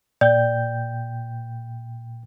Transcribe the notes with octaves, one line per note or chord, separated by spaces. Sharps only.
A#2 D5 G5 G6